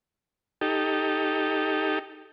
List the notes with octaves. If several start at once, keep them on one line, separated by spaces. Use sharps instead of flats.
D#4 G4 A4